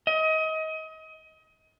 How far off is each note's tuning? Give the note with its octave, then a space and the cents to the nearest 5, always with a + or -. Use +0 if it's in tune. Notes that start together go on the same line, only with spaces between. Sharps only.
D#5 +30